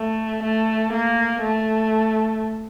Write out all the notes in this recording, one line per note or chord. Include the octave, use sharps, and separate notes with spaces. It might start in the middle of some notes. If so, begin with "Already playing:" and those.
Already playing: A3
A3
A#3
A3